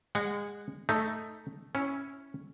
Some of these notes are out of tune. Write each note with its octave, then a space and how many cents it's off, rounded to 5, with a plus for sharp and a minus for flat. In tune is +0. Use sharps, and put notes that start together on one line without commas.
G#3 -25 F#5 +0
A3 +0 D#4 +0
C#4 +0 E4 +0